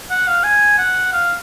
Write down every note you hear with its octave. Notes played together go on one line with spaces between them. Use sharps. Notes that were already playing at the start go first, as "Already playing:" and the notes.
F#5
F5
G#5
F#5
F5